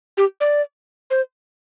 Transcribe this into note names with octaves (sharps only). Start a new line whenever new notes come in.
G4
D5
C5